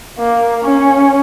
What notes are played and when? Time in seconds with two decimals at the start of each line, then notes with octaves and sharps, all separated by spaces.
0.19 A#3
0.64 C#4